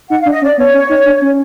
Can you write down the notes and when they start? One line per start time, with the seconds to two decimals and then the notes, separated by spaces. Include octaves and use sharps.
0.09 D#4 F#5
0.20 F5
0.25 D4
0.31 D#5
0.42 C#4 D5
0.58 B3 C#5
0.74 C#4
0.89 D#4
1.06 D4
1.22 C#4